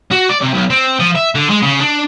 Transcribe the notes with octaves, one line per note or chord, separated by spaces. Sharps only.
F#4
D5
C3
B1
C4
F3
E5
D3
G#3
C#3
D4